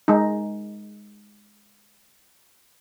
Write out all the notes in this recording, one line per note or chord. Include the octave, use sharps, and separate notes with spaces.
G#3 D#4